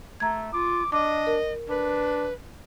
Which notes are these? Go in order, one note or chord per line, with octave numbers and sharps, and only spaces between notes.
A3 A#5 G#6
F4 D6
D4 D#5 D6
A#4
D4 B4